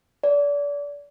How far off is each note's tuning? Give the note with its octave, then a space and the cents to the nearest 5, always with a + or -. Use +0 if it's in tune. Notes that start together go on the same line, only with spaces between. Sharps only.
D5 -30